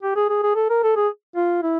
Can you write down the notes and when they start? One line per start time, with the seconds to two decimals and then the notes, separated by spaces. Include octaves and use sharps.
0.03 G4
0.16 G#4
0.29 G#4
0.43 G#4
0.55 A4
0.70 A#4
0.83 A4
0.96 G#4
1.36 F4
1.62 E4